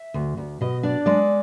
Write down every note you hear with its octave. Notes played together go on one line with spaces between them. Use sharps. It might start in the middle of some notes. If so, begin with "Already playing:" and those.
Already playing: E5
D2
D2
B2 D#5
D4 D5
G#3 D5